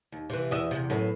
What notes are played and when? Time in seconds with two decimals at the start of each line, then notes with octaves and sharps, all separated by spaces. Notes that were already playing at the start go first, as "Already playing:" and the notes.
0.12 D#2
0.30 C3 E3
0.51 E2 D#5 E5
0.71 E2 C3
0.90 F#2 A2 B3